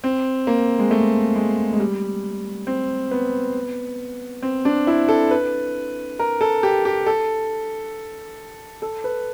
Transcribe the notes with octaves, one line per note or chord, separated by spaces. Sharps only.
C4
A#3
G#3
A3
G#3
G#3
G3
C4
B3
C4
D4
E4
A4
B4
A#4
A4
G4
G4
A4
A4
B4